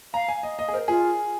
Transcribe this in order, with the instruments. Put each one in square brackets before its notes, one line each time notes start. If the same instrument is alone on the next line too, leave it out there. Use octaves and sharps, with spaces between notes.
[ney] F5 [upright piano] A#5
[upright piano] G#5
D#5
D#5
G#4
[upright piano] A#4 [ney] C5
[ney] F4 [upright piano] G#4